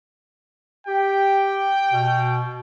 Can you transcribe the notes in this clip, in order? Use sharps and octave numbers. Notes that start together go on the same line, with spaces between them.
G4 G5
B2